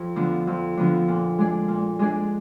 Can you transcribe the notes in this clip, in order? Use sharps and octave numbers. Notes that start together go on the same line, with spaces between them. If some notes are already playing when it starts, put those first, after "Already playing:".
Already playing: F2
D3 F3 B3 D4
F2
D3 F3 B3 D4
A#2
G#3 D4 G#4 D5
A#2
G#3 D4 G#4 D5